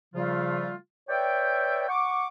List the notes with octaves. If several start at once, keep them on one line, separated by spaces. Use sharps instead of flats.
C#3 F3 G3 A3 F4
B4 C#5 D5 E5 G5
F#5 C#6 D6